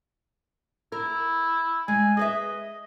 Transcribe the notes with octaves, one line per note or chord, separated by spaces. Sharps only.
E4 A#4
G#3 G#5
G#4 B4 D#5 E5